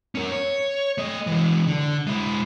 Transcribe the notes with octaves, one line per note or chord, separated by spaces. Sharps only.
C#4 A#4
C#5
A3 D#5
E3 G#3
D3
G#3 E4